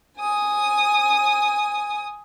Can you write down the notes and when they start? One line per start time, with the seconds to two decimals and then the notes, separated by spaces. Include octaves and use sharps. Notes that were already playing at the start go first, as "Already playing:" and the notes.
0.19 G#5 D#6